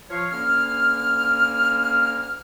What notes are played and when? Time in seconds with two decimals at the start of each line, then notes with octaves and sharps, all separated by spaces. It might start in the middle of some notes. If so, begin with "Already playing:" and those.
0.10 F3 C#5 F5
0.31 D2 A#3 C#4 F6